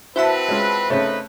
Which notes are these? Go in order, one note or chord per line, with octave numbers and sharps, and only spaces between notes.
C4 E4 F#4 B4 C5 E5 A5
G#3 C#4 F4
C#3 A3 C4 C#4 D#4 B4